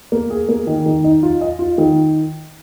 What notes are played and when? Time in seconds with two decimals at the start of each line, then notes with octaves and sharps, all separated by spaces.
0.12 A#3
0.30 G#4
0.49 A#3
0.67 D#3
0.86 D#3
1.04 D#4
1.23 F4
1.41 D#5
1.59 F4
1.78 D#3